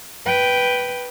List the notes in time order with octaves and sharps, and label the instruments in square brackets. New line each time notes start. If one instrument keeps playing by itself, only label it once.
[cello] B4 G5